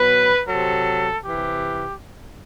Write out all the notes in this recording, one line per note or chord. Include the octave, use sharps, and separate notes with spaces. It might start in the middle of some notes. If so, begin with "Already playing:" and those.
Already playing: B2 F#3 B4
C3 F#3 A4
C3 E3 G4